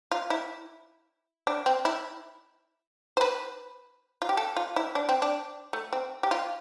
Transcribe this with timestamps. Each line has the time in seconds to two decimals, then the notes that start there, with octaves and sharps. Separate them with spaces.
0.11 F4
0.30 E4
1.47 D4
1.66 C4
1.85 E4
3.17 C5
3.21 B4
4.22 F4
4.29 G4
4.37 A4
4.57 F4
4.76 E4
4.95 D4
5.09 C4
5.22 D4
5.73 A3
5.93 C4
6.23 G4
6.31 F4